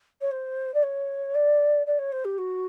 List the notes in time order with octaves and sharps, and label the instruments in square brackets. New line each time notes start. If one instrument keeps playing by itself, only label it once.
[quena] C#5
C5
D5
C#5
D5
D5
C#5
C5
G4
F#4